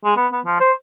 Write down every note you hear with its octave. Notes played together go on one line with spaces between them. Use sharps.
G#3
B3
B3
F3
C5